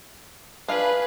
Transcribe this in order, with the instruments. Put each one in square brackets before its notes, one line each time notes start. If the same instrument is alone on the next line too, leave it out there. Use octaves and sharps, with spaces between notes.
[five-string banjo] D4 F4 F5 [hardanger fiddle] G#4 B4